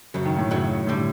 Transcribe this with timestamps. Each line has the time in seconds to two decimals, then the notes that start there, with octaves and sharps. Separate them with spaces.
0.14 F#2 C#3 F#3
0.25 D#3
0.37 A2
0.51 F#2 C#3 F#3
0.87 A2 D3 G3